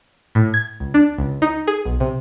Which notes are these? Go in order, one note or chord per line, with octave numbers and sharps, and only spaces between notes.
A2
G#6
C#2
D4
C#2
D#4
G#4
B1
C3